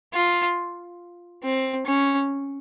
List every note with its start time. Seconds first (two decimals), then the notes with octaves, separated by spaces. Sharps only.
0.13 F4
1.44 C4
1.86 C#4